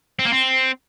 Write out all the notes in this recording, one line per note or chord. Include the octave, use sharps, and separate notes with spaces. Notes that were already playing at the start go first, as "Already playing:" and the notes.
C4
A#3
C4